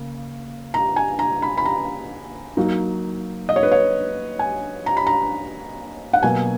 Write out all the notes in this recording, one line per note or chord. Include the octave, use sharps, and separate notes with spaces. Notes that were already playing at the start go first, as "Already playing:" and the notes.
Already playing: C#3 A#3
A#5
G#5
A#5
B5
B5
A#5
F#3 A#3 D#4
D#5
C#5
B4
C#5
G#5
A#5
B5
A#5
F#5
B2 F#3 A#3 G#5